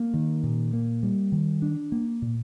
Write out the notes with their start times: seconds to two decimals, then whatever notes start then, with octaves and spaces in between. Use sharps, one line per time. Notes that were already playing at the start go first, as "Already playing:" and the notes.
Already playing: A#3
0.14 D#3
0.43 A#2
0.73 A#3
1.03 G3
1.32 D#3
1.62 D4
1.92 A#3
2.22 A#2